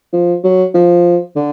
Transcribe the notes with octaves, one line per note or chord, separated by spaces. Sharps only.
F3
F#3
F3
D3